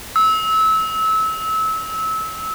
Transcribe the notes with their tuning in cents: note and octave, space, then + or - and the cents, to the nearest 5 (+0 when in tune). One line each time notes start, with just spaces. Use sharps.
E6 -25